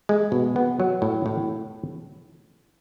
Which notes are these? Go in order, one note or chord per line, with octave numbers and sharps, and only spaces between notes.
G#3
B2
B3
F#3
A2
A2